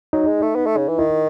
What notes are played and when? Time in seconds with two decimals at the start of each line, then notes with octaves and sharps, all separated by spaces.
0.13 F#3 D#4
0.27 G#3
0.42 A3
0.55 B3
0.66 A3
0.77 C#3
0.89 E3
0.99 D#3 E4